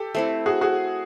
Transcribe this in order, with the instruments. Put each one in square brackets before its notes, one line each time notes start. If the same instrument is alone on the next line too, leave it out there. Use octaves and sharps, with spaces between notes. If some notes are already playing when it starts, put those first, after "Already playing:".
Already playing: [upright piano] G4 A4
[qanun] A3 C4 E4
[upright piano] F#4 G#4
F#4 G#4